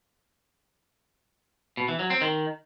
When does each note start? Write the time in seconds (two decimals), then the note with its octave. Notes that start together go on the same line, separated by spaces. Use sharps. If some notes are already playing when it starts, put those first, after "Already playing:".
1.77 B2
1.88 E3
1.99 F#3
2.10 C4
2.21 D#3